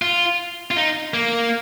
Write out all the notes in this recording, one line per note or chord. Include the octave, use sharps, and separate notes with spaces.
F4
F4
D#4
A#3